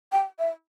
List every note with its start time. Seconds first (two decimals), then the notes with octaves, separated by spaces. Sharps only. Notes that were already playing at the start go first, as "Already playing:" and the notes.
0.12 G5
0.39 E5